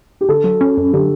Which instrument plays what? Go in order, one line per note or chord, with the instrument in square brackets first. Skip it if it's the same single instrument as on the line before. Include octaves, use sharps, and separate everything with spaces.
[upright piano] G4
[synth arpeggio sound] D3 [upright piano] A4
[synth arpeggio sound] F#3
C#4
F#2
[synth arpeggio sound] D3 [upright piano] G4